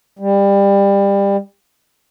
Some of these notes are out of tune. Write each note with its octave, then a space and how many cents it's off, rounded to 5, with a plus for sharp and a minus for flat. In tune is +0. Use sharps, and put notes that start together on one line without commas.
G3 +25